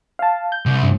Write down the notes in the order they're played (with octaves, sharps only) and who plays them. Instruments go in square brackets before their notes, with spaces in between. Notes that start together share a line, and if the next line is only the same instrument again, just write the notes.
[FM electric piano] F5 A5
G6
[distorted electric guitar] C2
[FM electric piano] G2